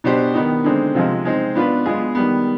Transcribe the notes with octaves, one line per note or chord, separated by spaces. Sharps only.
B2 B3 D4 G4 C5
D#3 B3 D#4
D3 G#3 C4 D#4
C3 F3 G#3
G#3 C4 D#4
B3 D4 F4 B4
G#3 B3 F4 G#4
D#3 G3 B3